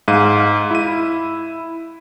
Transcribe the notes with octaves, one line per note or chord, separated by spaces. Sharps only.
G#2 F5 D#7
E4 D#7